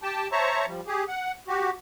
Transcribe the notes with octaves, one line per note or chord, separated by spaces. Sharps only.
G4 G5 A5
C5 C#5 E5 A5 A#5 C#6
F3 G3
G4 G#4
F#5
F#4 G4